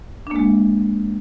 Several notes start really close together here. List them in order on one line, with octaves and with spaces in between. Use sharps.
D4 A#3 G#3